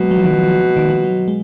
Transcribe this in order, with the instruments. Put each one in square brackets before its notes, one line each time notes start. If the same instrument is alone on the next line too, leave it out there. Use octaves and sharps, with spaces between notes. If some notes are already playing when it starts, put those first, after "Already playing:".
Already playing: [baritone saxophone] B2 [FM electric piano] F#3 G#3 A#3
[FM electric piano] F#3
F3
D#3
F3
D#3
F3
F#3
G#3